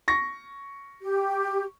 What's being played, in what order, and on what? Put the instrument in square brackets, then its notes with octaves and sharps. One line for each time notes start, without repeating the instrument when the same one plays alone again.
[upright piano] C#6 A#6
[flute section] G4